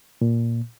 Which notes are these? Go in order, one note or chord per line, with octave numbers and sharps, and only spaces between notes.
A#2